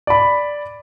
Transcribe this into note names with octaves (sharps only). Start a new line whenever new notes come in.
D5 B5